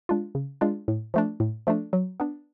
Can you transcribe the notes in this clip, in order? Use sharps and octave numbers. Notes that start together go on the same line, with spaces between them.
G#3 D4 F4
C#3
G#3 D4 F4
A2
F3 A3 D4
A2
F3 A3 D4
F#3
B3 D4